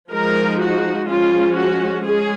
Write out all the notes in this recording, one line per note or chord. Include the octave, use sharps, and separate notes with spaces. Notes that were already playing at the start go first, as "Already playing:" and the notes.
F3 G#3 D#4 A#4
F#4
F3 G#3 C#4 F4
F#4
G#3 C#4 G#4